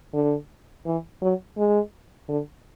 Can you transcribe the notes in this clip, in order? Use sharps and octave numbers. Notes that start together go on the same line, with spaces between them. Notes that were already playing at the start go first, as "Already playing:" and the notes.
D3
E3
F#3
G#3
D3